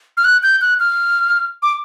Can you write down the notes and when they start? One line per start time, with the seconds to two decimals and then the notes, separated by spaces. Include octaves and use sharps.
0.17 F6
0.24 F#6
0.43 G6
0.61 F#6
0.80 F6
1.63 D6